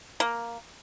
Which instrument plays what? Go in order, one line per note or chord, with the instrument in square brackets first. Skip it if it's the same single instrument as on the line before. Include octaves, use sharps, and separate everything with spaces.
[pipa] A#3